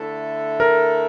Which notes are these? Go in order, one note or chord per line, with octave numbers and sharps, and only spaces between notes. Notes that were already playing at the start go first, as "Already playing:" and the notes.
Already playing: D3 A3 E4 A4
A#4